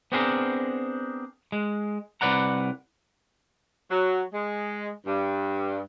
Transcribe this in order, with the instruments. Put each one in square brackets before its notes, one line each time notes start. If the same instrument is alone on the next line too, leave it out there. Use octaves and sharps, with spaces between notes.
[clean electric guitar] B3 C4 D4 G#4 A#4 C5
G#3
C2 F#2 B4 D5 F#5 A#5
[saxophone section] F#3
G#3
G2